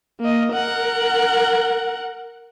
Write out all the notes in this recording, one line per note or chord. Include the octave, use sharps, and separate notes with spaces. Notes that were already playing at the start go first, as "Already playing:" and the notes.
A#3 D#5
A#4 F#5